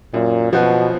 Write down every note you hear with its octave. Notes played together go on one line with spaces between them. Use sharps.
F#2 A#2
B2 F3 B3 F#4